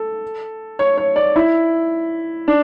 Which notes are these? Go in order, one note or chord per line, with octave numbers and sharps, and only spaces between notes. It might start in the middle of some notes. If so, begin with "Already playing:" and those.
Already playing: A4
C#5
C#5
D5
E4
D4